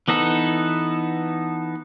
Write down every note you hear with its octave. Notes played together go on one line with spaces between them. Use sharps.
E3 B3 D#4 A4